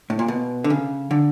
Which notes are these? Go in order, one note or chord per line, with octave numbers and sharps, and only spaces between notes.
A2
A#2
B2
D3
C#3
D3